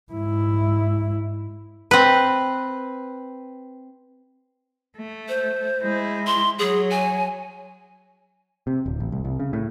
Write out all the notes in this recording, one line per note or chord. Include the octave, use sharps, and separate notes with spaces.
G#2 E4
C4 B4
A3
C5
G#3 E4
C6
F#3 G#4 C#5
G#5
C3
D1
A1
C2
C2
C#3
A2